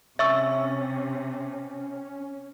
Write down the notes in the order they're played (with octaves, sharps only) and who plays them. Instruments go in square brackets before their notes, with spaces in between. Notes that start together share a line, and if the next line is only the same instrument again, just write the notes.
[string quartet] C3 [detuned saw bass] C#4 [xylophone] E5 C#6 E6